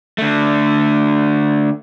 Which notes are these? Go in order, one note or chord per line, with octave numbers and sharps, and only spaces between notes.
D3 A3